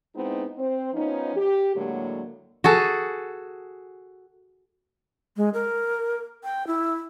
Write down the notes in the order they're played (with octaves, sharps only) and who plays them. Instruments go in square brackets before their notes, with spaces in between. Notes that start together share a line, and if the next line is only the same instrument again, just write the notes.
[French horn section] G#3 B3 C4 D#4 E4
C4 C5
F3 B3 C#4 D#4
G4
A2 D3 F#3 G#3 A#3
[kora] F#4 G#4 A4
[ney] G#3
A#4
G5
E4